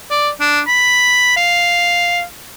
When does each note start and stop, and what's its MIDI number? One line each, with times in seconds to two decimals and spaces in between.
0.11 0.29 74
0.41 0.60 62
0.68 1.36 83
1.37 2.23 77